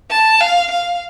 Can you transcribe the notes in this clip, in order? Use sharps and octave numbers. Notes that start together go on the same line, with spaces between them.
A5
F5
F5